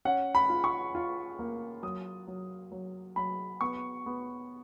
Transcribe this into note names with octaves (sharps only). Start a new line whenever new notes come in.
C#4 F#5
B5
F4
C#6
F4
A#3
F#3 D#6
F#3
F#3
F#3 B5
B3 C#6
B3